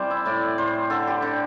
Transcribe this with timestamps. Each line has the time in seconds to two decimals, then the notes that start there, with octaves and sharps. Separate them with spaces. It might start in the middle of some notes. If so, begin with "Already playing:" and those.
Already playing: C3 E3 G3 C5 D5
0.11 E4
0.25 A2 D5
0.58 A2 C5
0.90 D3 A4
1.07 G4
1.22 D3